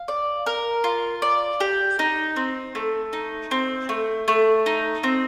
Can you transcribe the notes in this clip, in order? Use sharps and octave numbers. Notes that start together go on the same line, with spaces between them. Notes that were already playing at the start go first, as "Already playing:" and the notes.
Already playing: F5
D5
A#4
F4
D5
G4
D#4
C4
A3
D#4
C4
A3
A3
D#4
C4